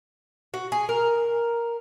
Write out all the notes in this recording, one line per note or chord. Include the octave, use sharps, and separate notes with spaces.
F#4
G#4
A#4